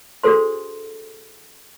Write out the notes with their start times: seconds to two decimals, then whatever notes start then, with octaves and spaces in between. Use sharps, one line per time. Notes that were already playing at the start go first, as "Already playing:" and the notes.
0.23 D4 F#4 G#4 A4 C5 C6